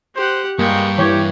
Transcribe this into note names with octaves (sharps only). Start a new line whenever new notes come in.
G4 C5 F#5
G2 G#3 A#3 G5 C#6
E3 G4 C#5